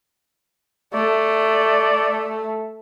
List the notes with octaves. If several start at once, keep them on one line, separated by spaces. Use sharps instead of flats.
A3 D5